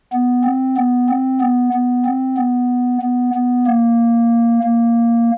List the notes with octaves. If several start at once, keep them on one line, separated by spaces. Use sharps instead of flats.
B3
C4
B3
C4
B3
B3
C4
B3
B3
B3
A#3
A#3